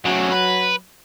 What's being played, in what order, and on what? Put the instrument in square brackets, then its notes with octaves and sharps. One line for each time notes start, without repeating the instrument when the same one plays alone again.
[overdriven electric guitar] C#3 A3 [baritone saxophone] F#3
[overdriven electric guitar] B4